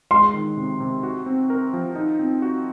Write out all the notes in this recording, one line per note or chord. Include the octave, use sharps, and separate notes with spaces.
G#3 C6
D#3
C3
C3
F#4
C4
A#4
F3
D#4
C4
F#4